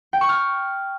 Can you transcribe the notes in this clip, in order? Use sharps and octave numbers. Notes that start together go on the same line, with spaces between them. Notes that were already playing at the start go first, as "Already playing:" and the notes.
G5
C#6
F6